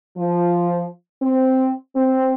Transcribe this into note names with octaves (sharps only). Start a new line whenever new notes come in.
F3
C4
C4